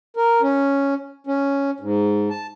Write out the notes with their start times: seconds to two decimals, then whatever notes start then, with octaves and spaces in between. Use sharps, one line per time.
0.17 A#4
0.41 C#4
1.27 C#4
1.80 G#2
2.30 A5